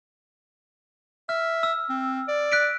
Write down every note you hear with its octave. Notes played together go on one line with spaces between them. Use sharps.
E5 F6
E6
C4
D5
F#6 B6 D7